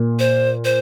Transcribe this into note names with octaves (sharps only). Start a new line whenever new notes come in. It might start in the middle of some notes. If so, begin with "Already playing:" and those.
Already playing: A#2
C5
C5